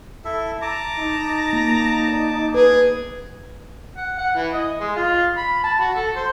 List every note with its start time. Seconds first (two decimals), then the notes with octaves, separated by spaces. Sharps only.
0.25 E4 A4 E5
0.62 A5 A#5 D6
0.98 D#4
1.53 A#3
2.08 D5
2.54 G#4 B4
3.97 F#5
4.18 F#5
4.36 E3
4.53 D#5
4.81 G#3
4.96 F4
5.37 B5
5.64 A5
5.80 F#4
5.95 A4
6.16 C5